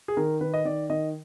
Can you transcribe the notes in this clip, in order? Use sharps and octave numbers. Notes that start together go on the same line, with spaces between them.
G#4
D#3 A#4
D#3 B4
D#5
D#3 D5
D#3 D#5